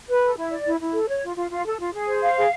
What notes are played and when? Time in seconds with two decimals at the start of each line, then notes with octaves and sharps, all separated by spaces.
0.09 B4
0.23 A4
0.37 E4
0.51 D5
0.65 E4
0.80 E4
0.93 A4
1.08 C#5
1.23 F4
1.36 F4
1.50 F4
1.65 A4
1.79 F4
1.93 G#4
2.08 C5
2.21 F5
2.36 G#4